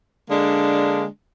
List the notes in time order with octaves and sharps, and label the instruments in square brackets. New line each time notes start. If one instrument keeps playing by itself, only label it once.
[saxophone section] D3 G#3 A#3 D4